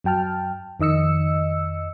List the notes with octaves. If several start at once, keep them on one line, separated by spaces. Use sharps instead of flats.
F#2 F#3 G5 A5 F6
F2 D#3 D#5 E6 C#7